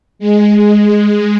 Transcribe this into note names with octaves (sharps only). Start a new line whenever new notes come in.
G#3